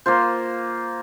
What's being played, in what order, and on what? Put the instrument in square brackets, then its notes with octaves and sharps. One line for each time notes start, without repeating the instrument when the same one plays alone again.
[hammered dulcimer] A#3 F4 C5